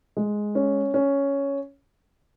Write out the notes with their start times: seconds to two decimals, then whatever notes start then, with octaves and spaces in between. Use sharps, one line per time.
0.17 G#3
0.55 C#4
0.94 C#4